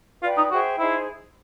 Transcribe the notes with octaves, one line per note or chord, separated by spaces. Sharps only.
F4 B4 D5 G5
D#4
F#4 G#4 C5 E5 G5
D#4 E4 G#4 C5